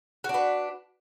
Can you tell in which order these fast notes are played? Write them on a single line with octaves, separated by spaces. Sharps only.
F#4 D4 B4